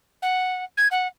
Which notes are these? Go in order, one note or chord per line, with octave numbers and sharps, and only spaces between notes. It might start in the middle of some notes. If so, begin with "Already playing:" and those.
F#5
G#6
F#5